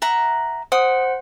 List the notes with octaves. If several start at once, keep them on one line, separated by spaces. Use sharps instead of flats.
E5 F#5 A#5
C5 F#5 D#6